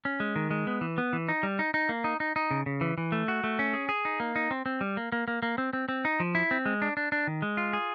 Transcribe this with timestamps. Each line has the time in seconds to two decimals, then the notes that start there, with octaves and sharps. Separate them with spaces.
0.05 C#4
0.20 G#3
0.36 D#3
0.51 G#3
0.67 B3
0.81 E3
0.98 B3
1.13 E3
1.29 D#4
1.43 G3
1.59 D#4
1.74 D#4
1.89 A#3
2.04 D#4
2.20 D#4
2.36 D#4
2.51 C#3
2.66 C#3
2.81 E3
2.98 E3
3.12 A3
3.28 F#4
3.44 A3
3.59 C#4
3.73 G#4
3.89 G#4
4.05 D#4
4.20 A#3
4.36 D#4
4.51 C4
4.66 C4
4.81 G3
4.97 A#3
5.12 A#3
5.28 A#3
5.43 A#3
5.58 C4
5.73 C4
5.89 C4
6.05 D#4
6.20 F3
6.35 E4
6.51 C4
6.66 G#3
6.82 D4
6.97 D4
7.12 D4
7.27 D#3
7.42 G#3
7.57 F4
7.73 G#4